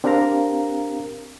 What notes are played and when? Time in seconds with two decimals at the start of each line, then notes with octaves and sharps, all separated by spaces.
0.04 C4 D4 G4 A#4 F5 A#5